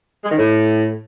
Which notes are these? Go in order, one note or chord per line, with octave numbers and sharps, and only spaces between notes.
G#3
D#3
A2